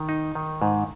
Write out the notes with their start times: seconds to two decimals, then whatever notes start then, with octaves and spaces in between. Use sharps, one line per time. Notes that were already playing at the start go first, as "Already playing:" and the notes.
Already playing: D#3
0.09 D#4
0.35 D#3
0.62 G#2